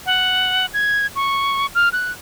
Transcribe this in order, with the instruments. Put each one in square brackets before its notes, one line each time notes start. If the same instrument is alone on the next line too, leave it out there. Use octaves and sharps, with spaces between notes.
[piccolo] F#5
G#6
C#6
F6
F#6